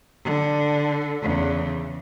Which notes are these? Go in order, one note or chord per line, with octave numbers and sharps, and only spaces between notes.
D3
E2 C#3